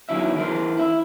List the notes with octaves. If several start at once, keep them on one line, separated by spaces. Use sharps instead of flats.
E2 D#3 F#3 E4 E5
E3 A#4 C5
E4 E5